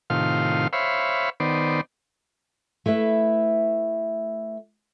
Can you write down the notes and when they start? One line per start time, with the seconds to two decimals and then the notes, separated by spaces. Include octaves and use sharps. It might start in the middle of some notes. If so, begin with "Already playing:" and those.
0.10 A2 C3 D#3 F4 F5 C6
0.73 C5 C#5 E5 F5 B5
1.40 D#3 B3 C5 D5
2.86 A3 E4 B4 E5